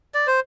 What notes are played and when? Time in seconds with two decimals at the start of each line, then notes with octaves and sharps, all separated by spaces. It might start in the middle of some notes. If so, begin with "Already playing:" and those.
0.14 D5
0.27 C5